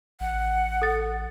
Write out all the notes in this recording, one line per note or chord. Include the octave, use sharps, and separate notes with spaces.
A1 F#5
A4 A6